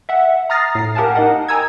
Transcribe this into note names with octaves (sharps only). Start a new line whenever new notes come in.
E5 F#5
A#5 D#6 F6 A6 A#6 C7
A2 C7
G4 A#4 F5 F#5 G#5 A5
D#4 D#5 F#5
G5 G#5 A#5 D#6 E6 G#6